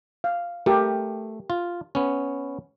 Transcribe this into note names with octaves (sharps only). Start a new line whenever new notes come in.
F5
A3 G4 A#4
F4
B3 C#4